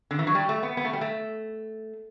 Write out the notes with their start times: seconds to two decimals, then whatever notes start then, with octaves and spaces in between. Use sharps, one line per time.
0.11 D3
0.19 E3
0.27 F#3
0.35 G3
0.49 A3
0.63 B3
0.77 B3
0.85 A3
0.93 G3
1.01 A3